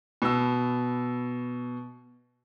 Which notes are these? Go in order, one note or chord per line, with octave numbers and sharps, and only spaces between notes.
B2 E6